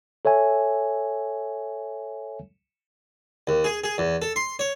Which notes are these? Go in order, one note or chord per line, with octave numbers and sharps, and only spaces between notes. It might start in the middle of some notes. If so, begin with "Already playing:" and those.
A4 C#5 E5 G#5
D#2
G#4
G#4
E2
A4
C6
C#5